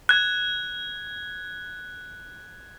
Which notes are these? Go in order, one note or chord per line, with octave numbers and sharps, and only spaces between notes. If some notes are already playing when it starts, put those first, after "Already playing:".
F#6 G#6